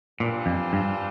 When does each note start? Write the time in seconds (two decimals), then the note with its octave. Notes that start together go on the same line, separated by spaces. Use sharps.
0.20 A#2 E3 G3 D4 F4 C5
0.46 F2
0.73 G2